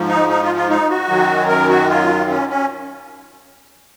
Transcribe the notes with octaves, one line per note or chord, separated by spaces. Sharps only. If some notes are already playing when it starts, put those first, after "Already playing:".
Already playing: G#2 F3
D#4
D#4
F4
F4
D#4
F#4
F#2 D#3 F#3
A#4
F#4
F4
C#4
C#4